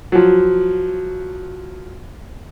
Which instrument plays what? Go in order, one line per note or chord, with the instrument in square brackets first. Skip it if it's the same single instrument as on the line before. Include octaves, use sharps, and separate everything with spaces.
[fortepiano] F3 F#3